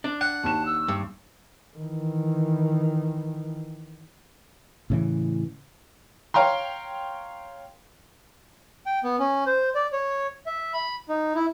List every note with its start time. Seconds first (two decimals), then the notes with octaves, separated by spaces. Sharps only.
0.04 D4
0.21 F#5
0.43 D#2 A5 E7
0.66 E6
0.88 G2
1.77 D#3 E3
4.90 A2 C#3 E3
6.34 C#5 F5 G5 A#5 C6
8.86 G5
9.04 B3
9.19 C#4
9.46 C5
9.75 D5
9.92 C#5
10.46 E5
10.74 B5
11.09 D#4
11.35 E4